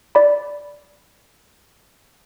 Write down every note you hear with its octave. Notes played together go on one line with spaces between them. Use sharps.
D5 B5